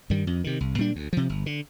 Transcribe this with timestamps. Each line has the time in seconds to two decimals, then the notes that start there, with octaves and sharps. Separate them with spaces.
0.10 G2 D#3 G3
0.27 F2
0.44 C3 D#3
0.60 C2
0.78 A#2 G3 D4
0.96 D2
1.13 C3 F3
1.29 G1
1.46 D3